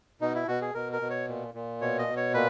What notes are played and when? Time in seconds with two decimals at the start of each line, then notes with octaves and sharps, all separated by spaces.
0.21 B2 D#4
0.35 E4
0.48 B2 F#4
0.62 G#4
0.74 B2 A#4
0.92 A#4
1.02 B2
1.10 C#5
1.28 A#2
1.54 A#2
1.81 B2 C#5
1.99 D#5
2.08 B2
2.17 C#5
2.34 A#2 B4